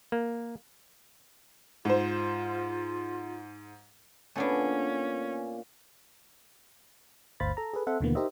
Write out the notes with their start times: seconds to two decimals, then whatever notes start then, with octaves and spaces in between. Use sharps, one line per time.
0.12 A#3
1.85 G#2 F4 C5
4.36 A#2 A3 B3 C#4 D4 G#5 D6
7.40 G1 D2 C5 F5 B5 A6
7.57 A4 A#5
7.73 G#4 A4 B4
7.87 C4 A4 C5 E5 F#5
8.00 D#2 B2 D3 E3 A#3 B3
8.15 D#4 G4 A#4 C5 D#5 E5